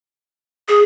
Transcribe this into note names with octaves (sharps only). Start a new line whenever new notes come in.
G#4